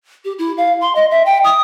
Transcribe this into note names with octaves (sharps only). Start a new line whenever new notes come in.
G4
E4
F5
C6
D#5
E5
G5
D#6